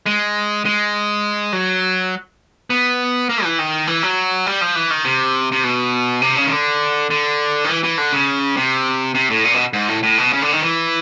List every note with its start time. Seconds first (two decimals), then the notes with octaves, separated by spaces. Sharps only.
0.06 G#3
0.65 G#3
1.53 F#3
2.70 B3
3.29 A#3
3.44 E3
3.59 D#3
3.87 E3
4.03 F#3
4.46 G3
4.61 F3
4.75 E3
4.90 D#3
5.05 C3
5.52 C3
5.63 B2
6.22 C3
6.36 C#3
6.46 D#3
6.51 D3
7.11 D3
7.64 D#3
7.69 E3
7.84 E3
7.98 D3
8.13 C#3
8.57 C3
9.15 C3
9.30 A2
9.44 A#2
9.54 B2
9.73 G#2
9.89 A2
10.03 A2
10.18 B2
10.33 C#3
10.42 D3
10.52 D#3
10.62 E3